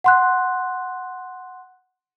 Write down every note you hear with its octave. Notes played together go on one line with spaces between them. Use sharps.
F#5 C6 F#6